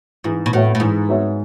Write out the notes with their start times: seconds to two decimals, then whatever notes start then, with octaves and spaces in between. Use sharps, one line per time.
0.24 G#2 E3
0.46 B2
0.53 A2 B3 F#4 C#5 E5
0.75 A2
0.80 G#2 E3
1.08 B3 F#4 C#5 E5